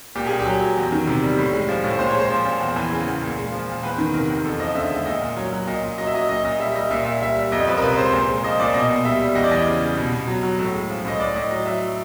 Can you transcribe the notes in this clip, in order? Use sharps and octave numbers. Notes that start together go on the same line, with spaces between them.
A#2 G4
A#2 G#4
G4
F#3
F#3
E2
D#3
C3
G3
A2
G#3
F3
A2
A#2 C5
C#5
G#3 C5
F3
A#2
E2
E3
C#3
E2
A#2
G#3
F3
A#2
E2 B4
D#3
C3 A#4
E2
F2 A4
F3 D#5
D3 E5
G#3 E5
A#2 D#5
A#2
F#3 C#5
F#3
A#2 D#5
A#2
F#3 D#5
E5
F#3 D#5
A#2 D#5
A#2 D#5
G3 E5
G3 D#5
A#2 E5
A#2 E5
G3 E5
G3
F2 D#5
F3 B4
A#4
C3 B4
G#3 C5
A#2 C5
G#3
F3 D#5
A#2 D5
B2 D#5
B2
G3 E5
G3
E2 D#5
D5
E3 D#5
C#3
G3
B2
B2
F#3
F#3
A2
G#3
F3
A2 D#5
A2 D5
A2 D#5
F#3 D#5
F#3 E5